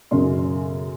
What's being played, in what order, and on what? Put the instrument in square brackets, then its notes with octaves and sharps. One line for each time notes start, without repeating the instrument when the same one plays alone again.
[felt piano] B1 F#2 C#3 C#5 C6